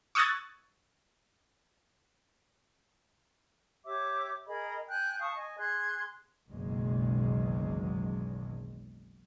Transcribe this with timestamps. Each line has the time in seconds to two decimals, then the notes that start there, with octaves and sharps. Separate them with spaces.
0.15 C#6 D#6 E6 F#6 G#6 A6
3.85 G4 C#5 E5 D6
4.47 G#4 A#4 D#5 B5
4.88 G5 G#5 F#6 G6
5.20 F5 A5 C#6 D#6
5.35 D#5 G#5
5.58 G#4 C6 F#6 G#6
6.49 F#1 B1 E2 B2 D#3 G#3